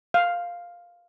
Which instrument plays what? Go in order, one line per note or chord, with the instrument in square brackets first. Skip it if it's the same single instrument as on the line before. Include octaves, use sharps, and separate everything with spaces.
[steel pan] F5